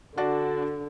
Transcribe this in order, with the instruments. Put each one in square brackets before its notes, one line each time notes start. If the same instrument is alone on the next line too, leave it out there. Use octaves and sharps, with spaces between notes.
[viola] D3 [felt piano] D4 F#4 D5